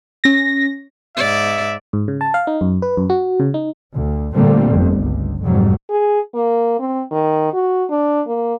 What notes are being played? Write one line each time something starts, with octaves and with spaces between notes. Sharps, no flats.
C#4 A#6
G#2 D5 E5
G#2
C#3
A5
F5
D#4
F#2
B4
F#2
F#4
C#3
D#4
D2
A#2 D3 G3 A3 A#3 C4
G1 F2
C#2
F1 F2 G#2 F#3 G3
G#4
A#3
C4
D#3
F#4
D4
A#3